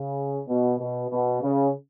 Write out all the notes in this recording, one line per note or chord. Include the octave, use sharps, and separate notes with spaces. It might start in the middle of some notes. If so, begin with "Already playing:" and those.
Already playing: C#3
B2
B2
B2
C#3